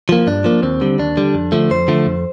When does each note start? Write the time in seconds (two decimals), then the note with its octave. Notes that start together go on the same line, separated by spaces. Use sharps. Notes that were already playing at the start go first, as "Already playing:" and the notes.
0.09 F3 A#3
0.27 G2 D4
0.44 F3 A#3
0.62 D#2 C4
0.81 D3 G3
0.99 D#2 D4
1.17 D3 G3
1.34 F2
1.52 D3 F3 A3
1.71 F2 C5
1.88 D3 F3 A3
2.06 F2